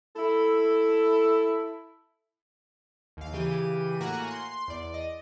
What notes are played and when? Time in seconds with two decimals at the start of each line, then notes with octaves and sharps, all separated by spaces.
0.16 E4 A4
3.17 D#2 F5
3.33 C#3 E3 G4 D#7
4.00 A2 A#3 F#4 G#5 A#5 F#6
4.31 C6
4.68 E2 D5
4.94 D#5